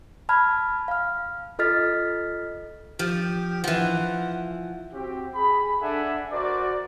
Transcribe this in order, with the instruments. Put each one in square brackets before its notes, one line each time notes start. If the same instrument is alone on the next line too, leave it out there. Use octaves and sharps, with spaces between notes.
[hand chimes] A5 B5 F6 G#6
F5 F6
F4 A4 D#5 F6 A6 B6
[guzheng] F3 [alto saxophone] G4
[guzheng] E3 F3 [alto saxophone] F#5
[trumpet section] C4 F#4 G4
G#4 B5
D4 A4 E5 F#5 G#5
F#4 A#4 C5 D5